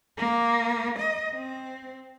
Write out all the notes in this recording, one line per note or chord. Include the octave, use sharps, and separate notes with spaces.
A#3
D#5
C4